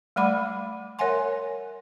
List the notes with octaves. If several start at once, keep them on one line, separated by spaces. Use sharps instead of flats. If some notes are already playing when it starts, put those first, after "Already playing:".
G3 A3 D5 F#5 B5 D6
A#4 C#5 E5 F#5 G#5 C6